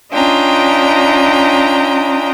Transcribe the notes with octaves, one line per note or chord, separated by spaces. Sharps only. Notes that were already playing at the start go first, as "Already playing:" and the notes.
C#4 D4 F4 D#5 G5 A#5